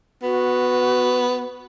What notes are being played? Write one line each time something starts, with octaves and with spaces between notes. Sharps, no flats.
B3 F#4